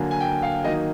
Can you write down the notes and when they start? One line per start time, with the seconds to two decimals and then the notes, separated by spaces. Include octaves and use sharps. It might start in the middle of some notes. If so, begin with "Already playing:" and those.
Already playing: D3 F#3 A#3 G#5
0.11 G#5
0.20 G5
0.42 F5
0.64 D#3 F#3 A#3 D#5